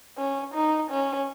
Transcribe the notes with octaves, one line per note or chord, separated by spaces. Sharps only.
C#4
D#4
C#4